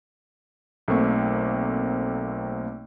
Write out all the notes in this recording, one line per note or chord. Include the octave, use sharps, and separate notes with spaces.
B1 A3 A#3 C4 C#6